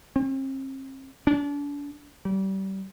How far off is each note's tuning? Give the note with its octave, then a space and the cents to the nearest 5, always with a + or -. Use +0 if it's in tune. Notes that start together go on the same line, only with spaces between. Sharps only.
C4 +40
D4 -35
G3 -30